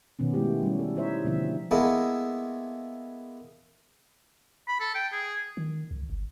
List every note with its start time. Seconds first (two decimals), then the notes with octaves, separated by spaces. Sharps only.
0.19 B2 D#3 B3 C#4
0.34 G#3 A3 B3 E4 G4
0.63 G3 C#4
0.79 A4
0.96 D#4 E4 C5 C#5 E5
1.25 B2 D3 F3 A3 C4 E5
1.71 G#3 A#3 B3 E4 A4
4.68 B5
4.80 A4
4.95 G5
5.12 G#4
5.57 D#3
5.91 C#2
6.10 G1